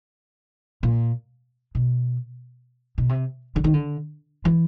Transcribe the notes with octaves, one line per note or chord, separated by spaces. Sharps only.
A#2
B2
B2
C3
D3
D#3
D3
E3